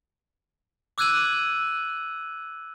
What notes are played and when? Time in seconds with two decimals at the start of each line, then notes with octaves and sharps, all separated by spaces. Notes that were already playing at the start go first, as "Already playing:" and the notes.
0.98 D6 E6 F#6 G#6 D#7 F#7